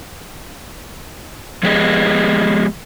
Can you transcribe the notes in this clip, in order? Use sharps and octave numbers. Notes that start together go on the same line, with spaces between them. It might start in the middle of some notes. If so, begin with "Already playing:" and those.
F3 G#3 B3 G4 G#4 D#5